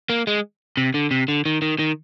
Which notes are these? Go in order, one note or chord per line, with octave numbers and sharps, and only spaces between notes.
A#3
G#3
C3
D3
C3
D3
D#3
D#3
D#3